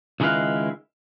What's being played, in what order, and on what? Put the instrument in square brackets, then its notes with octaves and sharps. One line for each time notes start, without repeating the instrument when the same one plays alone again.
[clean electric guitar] C#2 D#3 G#3 E4 B4 F5